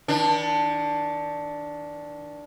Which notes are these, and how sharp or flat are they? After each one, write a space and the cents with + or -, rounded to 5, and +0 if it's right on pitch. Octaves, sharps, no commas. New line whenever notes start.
D#3 +45 D4 +0